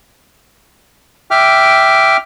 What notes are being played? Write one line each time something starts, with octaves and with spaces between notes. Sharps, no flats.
E5 G5 D6 F6